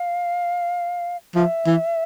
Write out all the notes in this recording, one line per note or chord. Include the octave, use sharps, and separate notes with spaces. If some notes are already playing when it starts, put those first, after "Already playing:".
Already playing: F5
F3 E5
E3